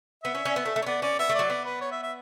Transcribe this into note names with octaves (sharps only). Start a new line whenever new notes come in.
B3 E5
C#4
C#4
B3
A3
A3
C#4
B3 D5
C#4 D5
B3 E5
A3
F#3 D5
B3 D5
B4
C#5
E5
E5